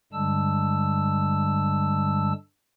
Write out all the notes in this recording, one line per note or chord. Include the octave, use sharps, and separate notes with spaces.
G2 D3 G3 G#3 A5 E6